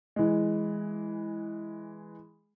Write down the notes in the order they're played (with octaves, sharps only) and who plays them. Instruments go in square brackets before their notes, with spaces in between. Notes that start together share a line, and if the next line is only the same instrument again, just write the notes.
[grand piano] E3 G#3